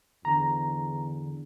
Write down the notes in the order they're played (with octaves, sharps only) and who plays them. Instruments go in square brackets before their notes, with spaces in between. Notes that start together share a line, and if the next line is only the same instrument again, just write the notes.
[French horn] E2 [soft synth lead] D3 [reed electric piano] A#5